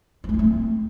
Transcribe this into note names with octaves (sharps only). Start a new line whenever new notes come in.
F4
A3
E4
A3
C4